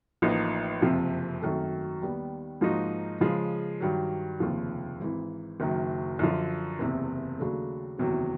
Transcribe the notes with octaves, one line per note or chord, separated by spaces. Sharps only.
A1 A2 F3 A#3 D#4
F#1 F2 C3 F3
G#1 F#2 D#3 F#3 A3
D#2 D#3 G3 B3
G#2 F3 A#3 D#4 F#4
C#3 F3 G#3
G2 D#3 F#3
F1 D#2 C#3 F3
G#1 G#2 E3
F#1 F#2 D#3 F#3
F#2 D3 F3
F#1 E2 C3
D#2 C#3 F#3 A3 D4
F#1 E2 C3 D#3 F#3